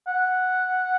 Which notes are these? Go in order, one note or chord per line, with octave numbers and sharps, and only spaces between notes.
F#5